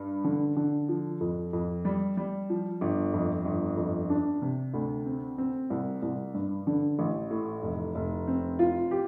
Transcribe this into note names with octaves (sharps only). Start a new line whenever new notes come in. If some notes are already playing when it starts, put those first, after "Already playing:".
Already playing: G2
D3
D3
F3
F2
F2
G3
G3
F3
G1
F2
G1
F2
D4
C3
D2
C4
C4
C2
C2
G2
D3
A1
A2
F1
F1
C4
F4
G4